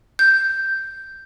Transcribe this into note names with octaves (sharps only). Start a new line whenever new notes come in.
G6